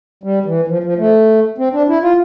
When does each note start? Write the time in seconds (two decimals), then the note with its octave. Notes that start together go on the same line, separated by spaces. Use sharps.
0.23 G3
0.45 E3
0.68 F3
0.84 F3
0.98 A3
1.58 C4
1.72 D4
1.88 E4
2.02 F4